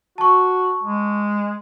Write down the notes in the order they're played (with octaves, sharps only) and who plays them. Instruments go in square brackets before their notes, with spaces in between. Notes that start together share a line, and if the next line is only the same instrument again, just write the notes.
[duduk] F#4 [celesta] A5 C#6
[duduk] G#3